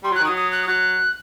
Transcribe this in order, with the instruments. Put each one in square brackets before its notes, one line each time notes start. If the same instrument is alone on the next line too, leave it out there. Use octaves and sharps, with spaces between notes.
[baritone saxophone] G3 [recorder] C6
[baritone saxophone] F#3 [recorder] F#6
[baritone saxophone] D#3
[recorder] D#6
[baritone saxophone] F#3
[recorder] D#6
F#6
D#6
[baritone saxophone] F#3 [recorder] F#6